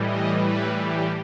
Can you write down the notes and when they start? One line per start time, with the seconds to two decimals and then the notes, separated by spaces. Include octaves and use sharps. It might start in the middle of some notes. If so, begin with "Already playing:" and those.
Already playing: A2 E3 G3 D#5
0.31 B4
0.69 G4